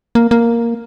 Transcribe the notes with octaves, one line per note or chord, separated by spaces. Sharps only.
A#3
A#3